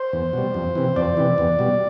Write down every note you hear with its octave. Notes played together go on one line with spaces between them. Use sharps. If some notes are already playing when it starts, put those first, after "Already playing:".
Already playing: C5
E2
B2 G3
F2
C3 E3
F2 D5
C3 E3
E2
B2 G3